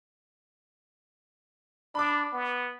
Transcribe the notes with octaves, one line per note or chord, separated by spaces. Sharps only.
D4 B5 D6
B3